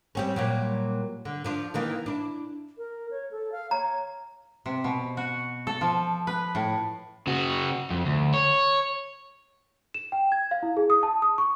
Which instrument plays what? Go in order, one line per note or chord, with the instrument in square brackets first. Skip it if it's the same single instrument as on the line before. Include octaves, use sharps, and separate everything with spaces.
[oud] G3 C4 C#4
A#2 F#3 G3
D3
F3 D4 F4
D#3 E3 A#3
D4 E4
[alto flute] A#4
C#5
A4
F5
[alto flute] C#5 [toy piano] A#5
[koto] C3
B2
F#4
A4
F3
B4
A2
[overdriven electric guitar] C#3 F#4
F2
D2
C#5
[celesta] E7
G5
G#6
F5
E4
G#4
D#6
A5
D#6
C#6